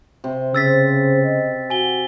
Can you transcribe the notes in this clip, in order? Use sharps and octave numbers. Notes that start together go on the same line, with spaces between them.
C3
C#3 C5 E6 A6 B6
D#5
F#4 G#5 G7